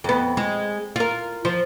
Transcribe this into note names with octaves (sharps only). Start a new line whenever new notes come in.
F2 B3
G#3
F4 A#4
F3